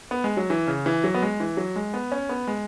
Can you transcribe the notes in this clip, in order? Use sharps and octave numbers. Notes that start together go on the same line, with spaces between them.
B3
G#3
F#3
E3
C#3
E3
F#3
B3
G#3
E3
F#3
G#3
B3
C#4
B3
G#3